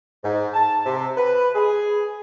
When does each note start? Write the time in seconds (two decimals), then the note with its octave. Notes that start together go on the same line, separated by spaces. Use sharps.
0.23 G#2
0.54 A5
0.86 C3
1.17 B4
1.55 G#4